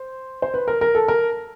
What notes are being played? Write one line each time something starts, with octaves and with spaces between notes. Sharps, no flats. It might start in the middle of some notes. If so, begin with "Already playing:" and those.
Already playing: C5
C5
B4
A#4
A#4
A4
A#4